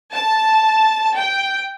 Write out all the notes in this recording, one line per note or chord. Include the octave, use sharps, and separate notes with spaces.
A5
G5